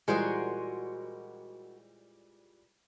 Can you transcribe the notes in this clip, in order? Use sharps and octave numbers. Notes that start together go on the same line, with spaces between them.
A#2 E3 G3 G#3 F#4 A#4 C5 D#5